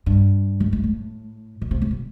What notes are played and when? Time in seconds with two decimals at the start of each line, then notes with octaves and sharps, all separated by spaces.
0.06 G2
0.60 F#2
0.73 G2
0.84 A2
1.62 A#2
1.71 C3
1.82 C3
1.91 A#2